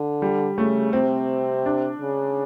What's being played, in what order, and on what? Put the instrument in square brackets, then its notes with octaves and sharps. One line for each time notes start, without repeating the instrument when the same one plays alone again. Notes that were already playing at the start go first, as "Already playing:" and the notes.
Already playing: [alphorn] D3
[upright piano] G3
[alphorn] C#3 [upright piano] A3
[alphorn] C3 [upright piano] C4
[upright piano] D4
[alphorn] C#3